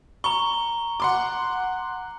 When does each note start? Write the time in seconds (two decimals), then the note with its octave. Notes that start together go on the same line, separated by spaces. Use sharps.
0.24 A#5 C#6 G7
1.00 F#5 C6 D6